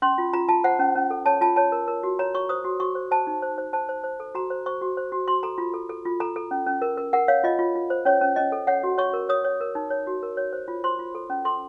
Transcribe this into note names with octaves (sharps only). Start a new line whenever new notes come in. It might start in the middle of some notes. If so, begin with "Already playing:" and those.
C#4 C6
F4
F4 A#5
F4 A5
C5 F#5
C#4
C#4
A4
C#5 A5
F4 A5
C#5 A5
A#4
A#4
F#4
C#5 A#5
C#5 C#6
C5 D#6
F#4
F#4 C#6
C5
C5 A5
D#4
C5
C5
C5 A5
C5
C5
A4
F#4 A#5
C5
C5 C#6
F#4
C5
F#4
F#4 C6
A4 A#5
F4
A4
A4
F4
A4 A#5
A4
C#4
C#4
A#4
A#4
A#4 F#5
C#5 F5
F4 D#5
F4
F4
C5
C#4 C#5
C#4
C#4 D#5
A4
C#5 F#5
F#4
C#5 C#6
A#4
C#5 D#6
C#5
A#4
D#4
C#5
F#4
A#4
C#5
C5
F4
C5 C6
F4
A4
C#4
A4 C6